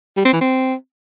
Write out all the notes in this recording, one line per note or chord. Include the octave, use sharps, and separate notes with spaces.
G3
C4
E3
C4